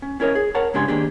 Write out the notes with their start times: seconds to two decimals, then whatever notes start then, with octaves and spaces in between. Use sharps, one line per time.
0.02 C#4
0.20 C#4 E4 A#4 C#5 D#5
0.35 G#4
0.55 A#4 C#5 F#5 A5
0.74 G#2 C#3 D4 G4 G#5 C6
0.88 D#3 A#3 D4 G4 G#4